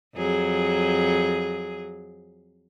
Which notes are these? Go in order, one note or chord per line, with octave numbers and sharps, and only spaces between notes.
F2 F#3 G#4